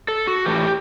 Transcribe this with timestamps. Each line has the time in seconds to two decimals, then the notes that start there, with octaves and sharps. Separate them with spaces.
0.08 A4
0.27 F#4
0.46 A2 E3 G4